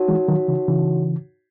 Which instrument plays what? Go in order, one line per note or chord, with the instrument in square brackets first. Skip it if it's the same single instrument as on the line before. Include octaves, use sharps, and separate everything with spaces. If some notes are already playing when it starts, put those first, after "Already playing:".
Already playing: [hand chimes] D#4 F#4 C#5 F#5 A5
[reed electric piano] E3 G#3
D#3 F#3
C#3 E3
C#3 E3